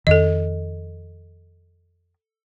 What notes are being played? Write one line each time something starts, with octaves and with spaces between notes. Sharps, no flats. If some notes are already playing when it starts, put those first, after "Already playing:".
F2 D#3 A4 D#5